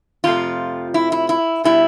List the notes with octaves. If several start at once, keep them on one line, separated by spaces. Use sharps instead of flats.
F2 C3 F3 A3 F4
E4
E4
E4
B2 G3 E4